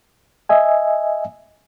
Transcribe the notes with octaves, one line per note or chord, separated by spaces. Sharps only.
D#5 E5 G#5